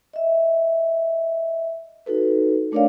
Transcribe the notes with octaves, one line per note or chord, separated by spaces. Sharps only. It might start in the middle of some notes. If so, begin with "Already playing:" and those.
D#5 E5
D#4 F#4 A4 B4
A3 D4 A#4 C#5 D5 F5